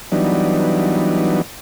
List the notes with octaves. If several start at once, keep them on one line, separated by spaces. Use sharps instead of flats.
E3 F#3 G3 B3 D4 D#4